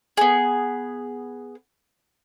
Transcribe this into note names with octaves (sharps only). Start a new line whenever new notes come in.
B3 G#4